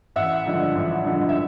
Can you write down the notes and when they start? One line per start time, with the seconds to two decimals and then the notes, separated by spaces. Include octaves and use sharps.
0.16 A1 E5 F#5
0.45 G2 D3 F3 G#3
0.75 A1
1.05 G2 D3 F3 G#3
1.29 E5